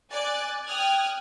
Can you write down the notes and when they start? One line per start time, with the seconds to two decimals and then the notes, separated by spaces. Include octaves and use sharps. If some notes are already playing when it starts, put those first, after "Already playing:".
0.12 D5 G#5 D6 F#6 A6
0.66 G5 D#6 F6 F#6 G#6